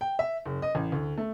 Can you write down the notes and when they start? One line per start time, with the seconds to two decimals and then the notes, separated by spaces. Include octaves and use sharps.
0.01 G5
0.19 E5
0.45 F#1
0.62 D#5
0.75 A1
0.92 D2
1.18 A3